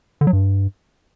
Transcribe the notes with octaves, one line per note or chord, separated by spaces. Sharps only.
D3
F#3
G2